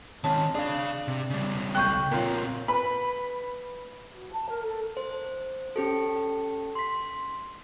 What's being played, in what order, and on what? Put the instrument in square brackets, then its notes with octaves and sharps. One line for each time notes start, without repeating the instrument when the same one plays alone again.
[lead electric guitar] D#3 C4 [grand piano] C#4 [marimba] A5
[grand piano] D4 [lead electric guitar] G#4 F5
[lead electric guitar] C3
C#3 G3
[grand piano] B1 F#6 [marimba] G5 C#6 G6
[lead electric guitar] A#2 C4 [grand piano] A#3 F4 C#5
[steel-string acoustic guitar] B4 [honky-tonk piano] B5
[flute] F#4
A5
A#4
A4
[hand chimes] C5
C#4 G4 A4
C6 B6